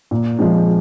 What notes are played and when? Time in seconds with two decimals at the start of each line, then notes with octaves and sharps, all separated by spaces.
0.11 A#2
0.39 F3 G#3 C4 F4